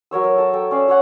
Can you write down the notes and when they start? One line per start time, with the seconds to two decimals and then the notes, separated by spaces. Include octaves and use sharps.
0.11 F#3 A#4 C#5 E6
0.24 A#4
0.36 A4 A5 A#5
0.53 A4 G5
0.71 C#4 D5 F5
0.88 A4 C#5 F#5